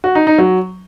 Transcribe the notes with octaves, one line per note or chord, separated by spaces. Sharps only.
F#4
D#4
D#4
F#3